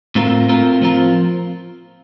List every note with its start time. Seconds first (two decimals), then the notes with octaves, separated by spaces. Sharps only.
0.15 A2 A3 C4 F4 A#4
0.48 A2 A3 C4 F4 A#4
0.82 F3 C4 F4 A#4